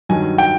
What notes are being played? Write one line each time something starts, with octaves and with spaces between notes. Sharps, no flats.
G2 D#3 F#3 G#5
G5